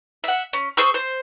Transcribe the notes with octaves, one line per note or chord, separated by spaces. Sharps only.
E5 F#5
C#4
G#4 C5 C#6 E6
C5